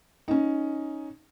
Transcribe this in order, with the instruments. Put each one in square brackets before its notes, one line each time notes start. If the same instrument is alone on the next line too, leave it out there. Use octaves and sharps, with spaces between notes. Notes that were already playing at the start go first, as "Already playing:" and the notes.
[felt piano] C#4 D#4